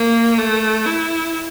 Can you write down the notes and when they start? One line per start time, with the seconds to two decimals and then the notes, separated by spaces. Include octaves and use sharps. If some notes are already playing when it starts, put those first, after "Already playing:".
Already playing: A#3
0.38 A3
0.86 E4